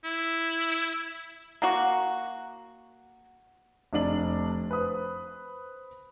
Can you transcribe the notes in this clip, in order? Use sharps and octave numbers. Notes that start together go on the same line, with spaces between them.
E4
A#3 F#4
F1 D4 F#7
B4 C5 D#6